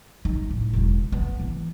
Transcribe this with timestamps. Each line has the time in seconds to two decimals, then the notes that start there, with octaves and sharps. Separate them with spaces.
0.25 D#4
0.50 A2
0.73 E1 E2
1.12 B3
1.40 E3